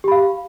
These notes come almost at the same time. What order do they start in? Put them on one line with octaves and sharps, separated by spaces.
G4 B5 F5